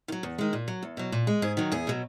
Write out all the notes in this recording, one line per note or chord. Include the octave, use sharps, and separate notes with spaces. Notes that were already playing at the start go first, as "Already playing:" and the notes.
D#3
F#3
E2
D#3 G#3
A#2
F#3
E2
B2 F#3
A#2
G#3
G#2 G#4
D#3 F#3
E2 G#4
B2 F#3